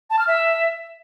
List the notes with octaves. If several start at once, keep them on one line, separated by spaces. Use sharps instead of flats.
A5
F6
E5